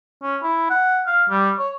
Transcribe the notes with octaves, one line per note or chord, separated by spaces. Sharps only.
C#4
E4
F#5
F5
G3
C#5